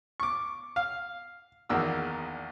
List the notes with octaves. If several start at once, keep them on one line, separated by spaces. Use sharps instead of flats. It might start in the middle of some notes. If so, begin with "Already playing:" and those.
C#6 D6
F5
A#1 E2 D#3 A#3 F#4 E6